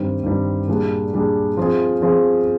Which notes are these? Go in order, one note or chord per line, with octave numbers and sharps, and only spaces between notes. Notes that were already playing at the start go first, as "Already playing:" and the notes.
Already playing: G2 D#3 G3 C4
G2 D#3 G3 C4
A#2 G3 D4 G#4
A#2 G3 D4 G#4
F3 C4 F4 G#4
F3 C4 F4 G#4